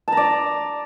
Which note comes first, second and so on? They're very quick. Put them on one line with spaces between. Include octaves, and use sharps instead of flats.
A5 A#5 D5